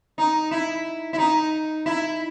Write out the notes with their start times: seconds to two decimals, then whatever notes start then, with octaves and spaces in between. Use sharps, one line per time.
0.18 D#4
0.51 E4
1.13 E4
1.18 D#4
1.86 E4